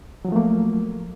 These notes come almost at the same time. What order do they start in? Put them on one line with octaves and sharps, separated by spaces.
F#3 F3 A3 A#3